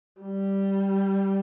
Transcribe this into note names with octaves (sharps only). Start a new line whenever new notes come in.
G3